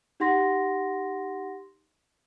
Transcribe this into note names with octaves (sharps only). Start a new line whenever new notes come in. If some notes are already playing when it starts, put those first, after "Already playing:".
D#4 G4 F#5 C6 A#6